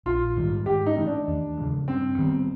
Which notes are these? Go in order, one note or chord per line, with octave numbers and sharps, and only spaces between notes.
A#1 F4
G#2 D#3 G3
G#2 G4
D#4
E3 A3 C#4
D4
D#2
C#3 F3 G#3
G2 C4
D#3 G3 B3